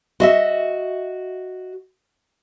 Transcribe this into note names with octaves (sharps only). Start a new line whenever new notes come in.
F#4 D#5 E5